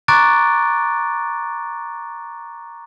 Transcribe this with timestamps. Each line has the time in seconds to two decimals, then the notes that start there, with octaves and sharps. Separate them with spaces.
0.08 A#5 C#6 D6 F#6 A6 D7